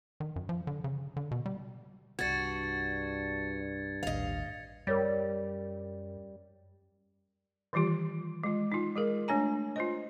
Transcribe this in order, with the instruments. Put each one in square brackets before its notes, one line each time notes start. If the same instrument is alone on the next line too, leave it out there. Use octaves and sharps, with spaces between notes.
[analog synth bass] D#3
F#2
F3
D3
C#3
D3
B2
G3
[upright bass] C2 [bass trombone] G2 [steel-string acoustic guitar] D4 F#4 [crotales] G#6 A6 C#7
[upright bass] A1 D#2 [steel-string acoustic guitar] D#5 F5
[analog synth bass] F#2 [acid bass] G3 [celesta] A#4 C#5 A6
[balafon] D#3 E3 G3 F4 G4
G#3 F4
D#4 F4
G#3 G#4 A#4
A3 D4 C#5 G#5 A#5
F4 C5 D#5